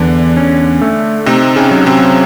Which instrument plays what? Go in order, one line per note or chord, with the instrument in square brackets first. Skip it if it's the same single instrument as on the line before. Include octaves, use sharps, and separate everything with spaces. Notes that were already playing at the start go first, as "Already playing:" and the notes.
Already playing: [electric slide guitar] E2 [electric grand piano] D3 D4
[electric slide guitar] C#4
A3
[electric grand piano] C3 C4 [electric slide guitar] D#4
[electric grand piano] C#3 C#4
[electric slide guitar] F#3
[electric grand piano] C3 C4